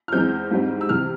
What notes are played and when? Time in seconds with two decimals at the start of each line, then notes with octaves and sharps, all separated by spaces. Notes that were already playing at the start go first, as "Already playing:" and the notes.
0.08 F6
0.12 E2 E3 G#3 C4 G6
0.51 G#2 G3 C4
0.81 E6
0.89 C3 E3 F6